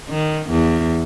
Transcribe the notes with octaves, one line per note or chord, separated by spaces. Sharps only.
D#3
E2